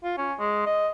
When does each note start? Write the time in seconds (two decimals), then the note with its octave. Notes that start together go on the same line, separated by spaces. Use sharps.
0.04 F4
0.17 C#4
0.40 G#3
0.66 D#5